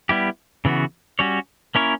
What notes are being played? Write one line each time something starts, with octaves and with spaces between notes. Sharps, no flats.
G3 B3 E4 G4
C#3 E3 B3 F#4
G3 C#4 F#4 C#5
A#3 C#4 E4 A#4 C#5